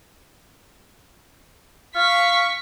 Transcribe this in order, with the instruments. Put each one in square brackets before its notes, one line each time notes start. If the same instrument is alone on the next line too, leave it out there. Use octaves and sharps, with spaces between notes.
[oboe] F5 [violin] C#6 B6